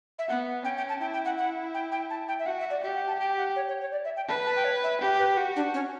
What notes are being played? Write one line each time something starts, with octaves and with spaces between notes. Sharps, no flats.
E5
B3 F#5
C#4 G5
G5
A5
E4 G5
G5
F#5
F#5
G5
G5
A5
G5
E5
F#4 F#5
E5
D5
G4 E5
F#5
A5
G4 G5
F#5
C#5
C#5
C#5
D5
E5
G5
B4 A5
A5
G5
C#5
E5
G4
B4
F#4 G4
D4
C#4